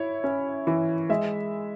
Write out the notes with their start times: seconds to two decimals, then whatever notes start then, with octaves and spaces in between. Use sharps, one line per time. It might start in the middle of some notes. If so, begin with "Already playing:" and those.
Already playing: E4 C#5
0.24 C#4
0.67 E3
1.09 G#3 E5